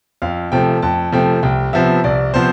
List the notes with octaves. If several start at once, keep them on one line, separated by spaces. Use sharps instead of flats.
F2 F5
C3 F3 A3 G5
F2 A5
C3 F3 A3 G5
C2 G5
C3 F3 B3 E5
C2 D5
C3 F3 B3 C5